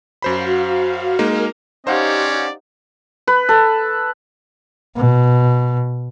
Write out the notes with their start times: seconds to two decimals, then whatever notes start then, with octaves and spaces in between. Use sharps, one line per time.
0.22 F#2 F#4 C5 F5 B5
1.19 G#3 A#3 D#4 A#4 F6
1.87 C#4 D#4 G4 C5 D5 F5 F#5
3.27 B4
3.49 A4
4.96 B2